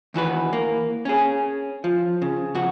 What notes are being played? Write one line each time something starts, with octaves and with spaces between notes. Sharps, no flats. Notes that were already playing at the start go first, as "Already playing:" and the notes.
D#2 E3 F#4 B4
A#3
C#4 G#4
F3
C#3
F2 F#4